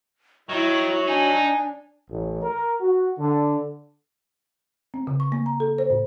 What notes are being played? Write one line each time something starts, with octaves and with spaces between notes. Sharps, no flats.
D#3 F#3 E4 C#6
D4 D#4 G#5
A1
A#4
F#4
D3
C4
C#3
C#6
A#3
A#5
A4
C5
A2